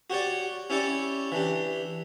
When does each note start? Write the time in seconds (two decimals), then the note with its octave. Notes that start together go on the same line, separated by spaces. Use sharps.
0.10 F#4 G4 C#5 D5
0.70 C#4 E4 G4 C#5 D5
1.32 E3 D4 G4